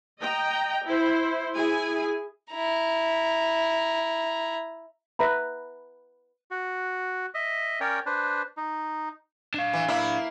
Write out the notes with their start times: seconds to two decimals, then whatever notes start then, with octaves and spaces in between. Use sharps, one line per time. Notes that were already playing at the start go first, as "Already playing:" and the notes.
0.20 D#5 G5 A#5
0.85 E4 C5
1.54 E4 G#4 G#5
2.51 E4 A#5
5.19 B4 E5 A#5 B5
6.51 F#4
7.35 D#5 E5
7.81 C#4 A#4 C#5 D5 G5
8.06 D4 B4 C5
8.57 D#4
9.54 D4 F5
9.73 E3
9.88 A#3 E4